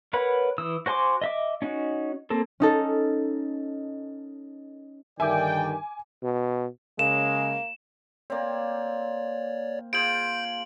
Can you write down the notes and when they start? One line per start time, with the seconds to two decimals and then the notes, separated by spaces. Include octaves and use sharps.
0.13 A#4 B4 C#5 F#5 B5
0.58 E3 D#6 E6
0.86 F#4 C5 G#5 C6 D6
1.22 D#5 E5 D6
1.62 C#4 D#4 F#4
2.30 A#3 C4 A4
2.60 C#4 D#4 A4
5.20 G2 D3 D#3 D5 E5 G5 G#5 D6
6.23 B2
6.99 C#3 G#3 A#3 E7
8.30 A#3 C4 C#5 D5
9.93 F4 G#4 C5 G6 D7 F#7